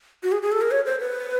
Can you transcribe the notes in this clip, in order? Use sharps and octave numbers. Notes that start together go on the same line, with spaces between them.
F#4
G#4
G#4
A4
A#4
C#5
C5
B4